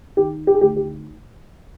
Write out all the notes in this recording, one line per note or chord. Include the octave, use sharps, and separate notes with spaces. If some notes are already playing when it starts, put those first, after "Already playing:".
D#3 G4
G4
G#4
D2 G4
G4